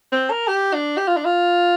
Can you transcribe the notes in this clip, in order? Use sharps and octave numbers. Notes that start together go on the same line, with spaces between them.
C4
A#4
G4
D4
G4
F4
D4
F4